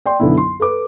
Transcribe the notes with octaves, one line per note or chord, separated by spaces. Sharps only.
D5 G5 C6
B1 F#2 D3 B3 E4
C6
A4 B4 D6